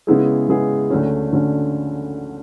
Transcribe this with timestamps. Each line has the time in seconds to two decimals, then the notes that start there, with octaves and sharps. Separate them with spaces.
0.07 C#3 G#3 B3 E4 G#4
0.48 C#3 G#3 B3 E4 G#4
0.91 D2 D3 A3 C#4
1.33 D2 D3 A3 C#4